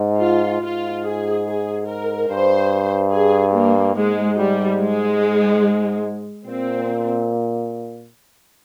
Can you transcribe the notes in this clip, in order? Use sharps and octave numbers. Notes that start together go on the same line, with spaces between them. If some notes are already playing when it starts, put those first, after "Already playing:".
Already playing: G#2
F4
G#2 F4
G#4
G#4
A#4
G2 C5
G#4
A#3
G#2 G#3
G3
G#3
A#2 C4